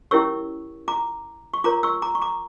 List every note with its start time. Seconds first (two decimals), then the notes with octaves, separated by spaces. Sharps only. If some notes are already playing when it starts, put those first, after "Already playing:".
0.11 C#4 E4 G4 A#4 C#5 C#6 E6
0.88 A#5 D6
1.54 C#6
1.64 F4 A#4 C#5 A#5 D6
1.83 C#6 E6
2.02 A#5 D6
2.15 C#6
2.22 A#5 D6